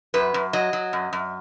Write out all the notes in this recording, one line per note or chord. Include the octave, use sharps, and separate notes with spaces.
F#2 B4
F#2
F#3 D#5
F#3
F#2
F#2